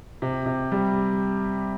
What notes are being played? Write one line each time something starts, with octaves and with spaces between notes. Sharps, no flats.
C3
C3
G3